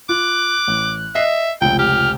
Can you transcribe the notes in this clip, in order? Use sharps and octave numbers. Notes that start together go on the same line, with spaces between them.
F4 D6 F#6
A1
D#5 E5 C7
F1 C#2 G5
G4 F6